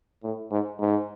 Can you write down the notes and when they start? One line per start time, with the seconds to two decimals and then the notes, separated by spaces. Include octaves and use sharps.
0.23 A2
0.51 G#2
0.79 G#2